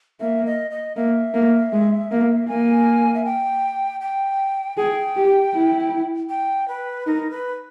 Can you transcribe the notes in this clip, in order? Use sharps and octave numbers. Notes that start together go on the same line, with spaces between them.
A#3 E5
D#5
D#5
A#3 E5
A#3
G#3
A#3
A#3 G#5
E5
G5
G5
G#4 G5
G4
E4
G5
B4
D#4 A#4
B4